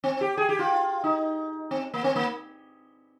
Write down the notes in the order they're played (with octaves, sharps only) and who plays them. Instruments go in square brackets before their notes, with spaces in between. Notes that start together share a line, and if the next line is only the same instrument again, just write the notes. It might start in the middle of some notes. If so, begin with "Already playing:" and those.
[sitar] C4
G4
G#4
G4
F4
D#4
C4
A#3
C4
A#3